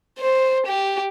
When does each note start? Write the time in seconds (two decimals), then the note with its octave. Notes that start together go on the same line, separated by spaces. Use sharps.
0.19 C5
0.67 G4